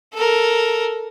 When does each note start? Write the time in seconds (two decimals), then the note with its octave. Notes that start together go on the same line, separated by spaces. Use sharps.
0.14 A4 A#4